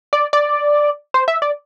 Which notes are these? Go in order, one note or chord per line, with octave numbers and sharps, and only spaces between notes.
D5
D5
C5
E5
D5